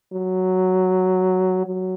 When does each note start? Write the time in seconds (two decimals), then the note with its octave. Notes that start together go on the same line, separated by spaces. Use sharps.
0.13 F#3
1.66 F#3